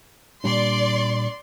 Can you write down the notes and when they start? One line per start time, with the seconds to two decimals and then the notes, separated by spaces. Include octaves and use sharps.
0.44 A#2 G3 D4 D5 C6